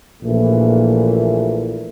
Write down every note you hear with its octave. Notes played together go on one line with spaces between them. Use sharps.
A#1 A#2 E3 A3